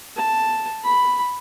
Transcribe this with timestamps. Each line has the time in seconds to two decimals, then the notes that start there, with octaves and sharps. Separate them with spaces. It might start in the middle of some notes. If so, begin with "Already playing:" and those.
0.17 A5
0.84 B5